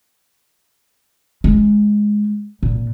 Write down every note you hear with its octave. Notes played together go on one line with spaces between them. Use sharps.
G#3
A#2